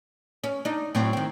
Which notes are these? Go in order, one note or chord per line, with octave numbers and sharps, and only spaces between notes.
C#4
D4 D#4
A2 F#3 C4
D#3 C4